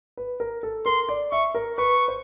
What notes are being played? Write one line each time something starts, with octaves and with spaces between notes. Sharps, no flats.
B4
A#4
A4
A#4 C6
D5
E5 C#6
A#4
B4 C#6
C5